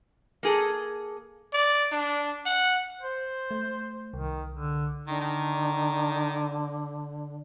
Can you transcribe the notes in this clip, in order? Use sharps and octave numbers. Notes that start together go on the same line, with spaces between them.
A#3 G#4 A4
D5
D4
F#5
C5
A3
C2 D#3
D3
D3 D#3
D#3